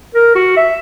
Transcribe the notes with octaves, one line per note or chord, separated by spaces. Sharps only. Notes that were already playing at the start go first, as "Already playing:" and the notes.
A#4
F#4
E5